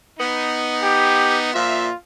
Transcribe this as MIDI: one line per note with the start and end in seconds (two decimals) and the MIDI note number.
0.19 1.49 59
0.19 1.49 63
0.82 1.38 67
1.54 1.88 46
1.54 1.88 53
1.54 1.95 65
1.54 1.88 76